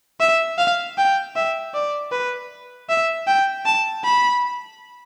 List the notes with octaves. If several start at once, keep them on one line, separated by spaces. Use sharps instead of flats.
E5
F5
G5
E5
D5
B4
E5
G5
A5
B5